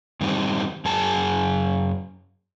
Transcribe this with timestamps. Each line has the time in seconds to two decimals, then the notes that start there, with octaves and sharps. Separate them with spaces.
0.21 G2 D#3 G3 C4 D#4
0.85 F#2 G#4 A5